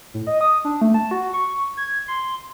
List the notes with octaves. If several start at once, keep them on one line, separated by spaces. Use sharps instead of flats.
A2
D#5
D#6
D4
A3
A5
F#4
C#6
G#6
C6